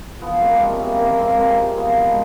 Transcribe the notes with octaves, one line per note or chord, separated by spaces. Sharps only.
F3 B3
G#3 A#3 C4
C3 B3 C#4
C3 A#3 C4
F3 A#3 C4
G#3 A#3 C4
C3 A#3 C4
C3
F3 B3
G#3